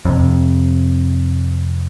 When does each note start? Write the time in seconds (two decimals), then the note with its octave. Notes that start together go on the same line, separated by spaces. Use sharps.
0.05 F2 C3